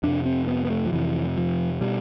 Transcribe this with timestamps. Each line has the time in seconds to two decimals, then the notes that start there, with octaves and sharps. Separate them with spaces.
0.03 F2 C3 D4
0.26 C4
0.48 B3
0.65 B3
0.70 A3
0.86 F3
0.92 F2 C3 E3
1.37 F3
1.81 B2 G3